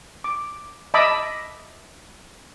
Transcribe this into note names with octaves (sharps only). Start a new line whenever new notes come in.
D6
D#5 E5 A5 B5 D6